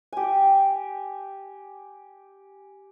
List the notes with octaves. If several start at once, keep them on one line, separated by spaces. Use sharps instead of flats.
G4 G#5